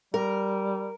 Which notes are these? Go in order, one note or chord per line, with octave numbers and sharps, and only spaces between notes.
G3 A#4